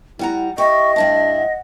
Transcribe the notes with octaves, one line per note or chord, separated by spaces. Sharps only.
G3 E4 F#5 A#5
E4 G4 D#5 C#6
G2 D4 E4 A5
F#5